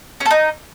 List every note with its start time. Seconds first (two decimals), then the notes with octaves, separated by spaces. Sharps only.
0.20 C#4
0.26 A4
0.31 D#4